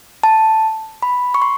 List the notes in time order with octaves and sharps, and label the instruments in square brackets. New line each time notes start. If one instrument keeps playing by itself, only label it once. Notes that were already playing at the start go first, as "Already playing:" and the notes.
[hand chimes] A5
B5
C#6
C6